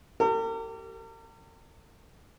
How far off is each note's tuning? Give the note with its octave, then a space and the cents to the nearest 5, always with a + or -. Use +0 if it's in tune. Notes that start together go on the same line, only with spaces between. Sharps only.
G4 -20 A#4 -45